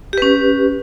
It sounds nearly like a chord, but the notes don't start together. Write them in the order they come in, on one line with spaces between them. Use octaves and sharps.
G4 B4 C#4